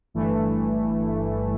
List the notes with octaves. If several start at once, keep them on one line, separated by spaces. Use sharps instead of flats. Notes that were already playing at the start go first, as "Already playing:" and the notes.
G1 G2 E3 A3